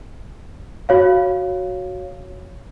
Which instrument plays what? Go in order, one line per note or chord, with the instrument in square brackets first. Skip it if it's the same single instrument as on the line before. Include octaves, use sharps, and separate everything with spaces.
[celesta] F#4 C#5 F5